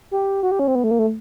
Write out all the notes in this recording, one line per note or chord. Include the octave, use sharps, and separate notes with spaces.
G4
F#4
G4
C#4
C4
B3
A3
A#3
A3